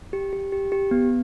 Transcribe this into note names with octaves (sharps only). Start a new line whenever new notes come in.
G4
G4
G4
G4
B3